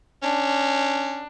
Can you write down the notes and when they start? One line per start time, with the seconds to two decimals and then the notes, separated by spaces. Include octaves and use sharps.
0.23 C#4 D4